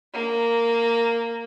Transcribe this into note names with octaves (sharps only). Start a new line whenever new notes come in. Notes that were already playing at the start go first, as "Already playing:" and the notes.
A#3